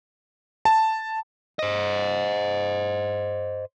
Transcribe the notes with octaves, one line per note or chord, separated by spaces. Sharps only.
A5
C5 D#5